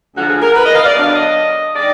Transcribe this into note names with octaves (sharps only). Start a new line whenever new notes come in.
D2 D3 F3 F#4
G#4
A#4
B4
D#5
F5
D5
D3 F#3 B3 D4 F5
D#5
D#3 G#3 D5